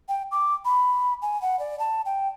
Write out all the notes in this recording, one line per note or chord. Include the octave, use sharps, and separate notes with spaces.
G5
D6
B5
G#5
F#5
D5
A5
G5